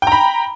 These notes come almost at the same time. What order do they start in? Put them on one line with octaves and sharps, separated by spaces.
G5 A#5 B5